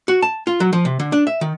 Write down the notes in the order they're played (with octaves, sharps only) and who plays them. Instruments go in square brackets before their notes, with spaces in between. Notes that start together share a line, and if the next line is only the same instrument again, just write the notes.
[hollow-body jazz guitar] F#4
A5
F4
F#3
F3
C3
D3
D4
E5
D#3